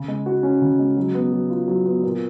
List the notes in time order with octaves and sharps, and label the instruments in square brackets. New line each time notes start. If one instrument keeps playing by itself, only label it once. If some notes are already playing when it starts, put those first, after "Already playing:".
Already playing: [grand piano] C#3
G#3
F#4
C#4
C#3
G#3
F#3
B3
F#3
F4
F#3
B3
A#2